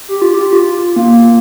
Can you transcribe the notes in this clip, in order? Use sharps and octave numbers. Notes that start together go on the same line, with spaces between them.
G4
F4
G4
F4
A#3